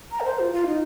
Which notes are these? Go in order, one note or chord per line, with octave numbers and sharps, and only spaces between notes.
A#5
A#4
C5
F4
F4
D#4